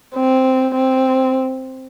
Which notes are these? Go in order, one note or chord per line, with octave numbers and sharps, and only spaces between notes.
C4
C4